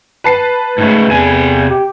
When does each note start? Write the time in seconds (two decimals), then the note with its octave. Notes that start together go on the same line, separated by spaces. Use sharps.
0.24 B4 A5 C7
0.78 G#2 C#3 A3
1.11 E2 C3 G#5
1.71 G4